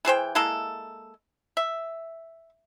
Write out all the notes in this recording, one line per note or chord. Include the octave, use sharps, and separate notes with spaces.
E3 G#4 C5 G5
G#3 A#3 E4 A4
E5